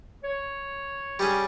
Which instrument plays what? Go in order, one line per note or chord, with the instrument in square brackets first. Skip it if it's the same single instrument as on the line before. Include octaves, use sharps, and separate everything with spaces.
[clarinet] C#5
[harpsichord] G3 C#4 G#4